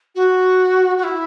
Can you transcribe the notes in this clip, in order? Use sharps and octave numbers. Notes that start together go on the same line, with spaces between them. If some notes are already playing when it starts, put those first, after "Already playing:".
F#4
F#4
E4